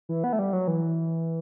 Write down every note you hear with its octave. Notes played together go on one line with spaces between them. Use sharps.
E3
B3
A3
G3
F#3
E3